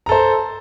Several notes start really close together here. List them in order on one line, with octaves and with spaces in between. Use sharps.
A#5 A4 C5